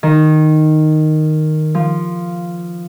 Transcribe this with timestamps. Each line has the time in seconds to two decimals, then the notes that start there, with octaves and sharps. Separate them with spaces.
0.03 D#3
1.75 F3